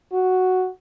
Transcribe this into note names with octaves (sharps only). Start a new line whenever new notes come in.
F#4